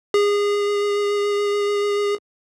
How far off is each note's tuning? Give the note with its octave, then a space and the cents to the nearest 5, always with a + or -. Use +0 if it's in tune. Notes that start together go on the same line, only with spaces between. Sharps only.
G#4 -25